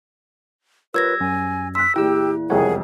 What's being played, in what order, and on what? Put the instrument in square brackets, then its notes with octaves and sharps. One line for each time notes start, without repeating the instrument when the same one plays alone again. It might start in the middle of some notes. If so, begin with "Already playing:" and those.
[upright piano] G3 [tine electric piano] F4 A#4 C#5 [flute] B4 [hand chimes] E6 G#6 A#6
[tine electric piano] F#2 [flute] G#5
[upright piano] C6 F#6 [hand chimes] E6 [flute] B6
[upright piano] E2 A#2 [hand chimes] E4 [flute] G4 [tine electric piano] G5 E6
[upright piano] E1 C2 F2 [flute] G#4 [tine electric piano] A#4 C#5 F#5